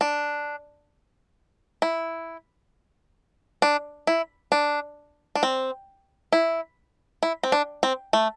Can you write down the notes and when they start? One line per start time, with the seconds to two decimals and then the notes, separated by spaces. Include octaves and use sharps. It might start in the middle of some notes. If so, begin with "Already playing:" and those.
0.01 D4
1.82 E4
3.62 D4
4.07 E4
4.52 D4
5.35 D4
5.43 C4
6.33 E4
7.23 E4
7.43 C4
7.52 D4
7.83 C4
8.13 A3